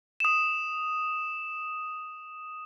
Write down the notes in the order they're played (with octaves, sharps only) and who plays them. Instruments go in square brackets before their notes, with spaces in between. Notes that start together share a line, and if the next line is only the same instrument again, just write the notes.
[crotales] D#6 E7